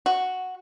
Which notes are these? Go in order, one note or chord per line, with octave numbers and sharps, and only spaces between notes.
F#4